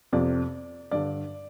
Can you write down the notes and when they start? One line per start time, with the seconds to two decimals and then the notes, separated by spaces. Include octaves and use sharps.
0.13 F2 C3 D5
0.91 G2 D3 D5